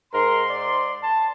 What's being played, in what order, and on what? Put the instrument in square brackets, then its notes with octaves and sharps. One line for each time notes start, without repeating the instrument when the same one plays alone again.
[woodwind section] G#2 C6 [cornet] A#4
[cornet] D5
A5